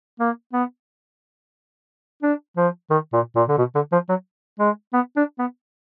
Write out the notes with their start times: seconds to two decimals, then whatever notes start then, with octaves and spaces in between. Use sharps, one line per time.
0.20 A#3
0.53 B3
2.23 D4
2.57 F3
2.90 D#3
3.13 A#2
3.36 A#2
3.49 D3
3.58 B2
3.75 D3
3.92 F3
4.09 F#3
4.59 G#3
4.93 B3
5.16 D4
5.39 B3